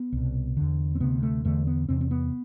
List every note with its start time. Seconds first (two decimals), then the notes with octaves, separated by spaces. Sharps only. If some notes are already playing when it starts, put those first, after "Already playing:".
Already playing: B3
0.12 C2 B2
0.57 E2 D3
0.95 C4
1.00 D2 C3 B3
1.23 A3
1.45 E2 D3 A3
1.67 B3
1.89 E2 C3 C4
2.01 C4
2.11 B3